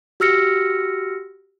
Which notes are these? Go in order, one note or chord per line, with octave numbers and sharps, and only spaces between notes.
F#4 G4 E6 F6 A#6 C#7